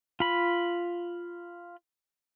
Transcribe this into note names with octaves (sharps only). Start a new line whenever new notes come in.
F4 B5